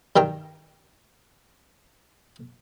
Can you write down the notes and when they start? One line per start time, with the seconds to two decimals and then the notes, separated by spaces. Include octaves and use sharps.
0.16 G2 D#3 G5 A#5